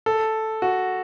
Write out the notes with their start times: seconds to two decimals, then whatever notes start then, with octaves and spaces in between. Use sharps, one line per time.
0.06 A4
0.62 F#4